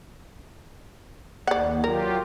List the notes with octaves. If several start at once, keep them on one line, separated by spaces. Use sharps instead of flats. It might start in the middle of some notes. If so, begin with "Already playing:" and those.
D#2 D5 F#5
F#3 F4 G4 A#4